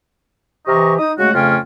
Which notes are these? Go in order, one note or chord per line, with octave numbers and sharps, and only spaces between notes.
C3 E3 G4 D#5 A#5 C#6
D#4 D#6
C#3 G#3 A3 F#4
F2 C#3 A3 C#4 F4 G5